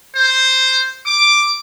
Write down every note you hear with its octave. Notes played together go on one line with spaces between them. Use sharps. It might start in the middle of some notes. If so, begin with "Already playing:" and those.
C5
D6